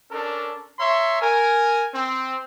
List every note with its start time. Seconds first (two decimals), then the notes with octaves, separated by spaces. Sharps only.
0.11 C#4 D4 A4 A#4
0.79 C#5 E5 A#5 C6
1.22 A#4 G#5
1.94 C4